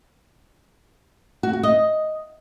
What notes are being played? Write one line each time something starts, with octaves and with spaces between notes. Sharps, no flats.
F#4
F#4
D#5